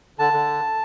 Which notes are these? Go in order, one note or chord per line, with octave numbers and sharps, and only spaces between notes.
D3 A5
D3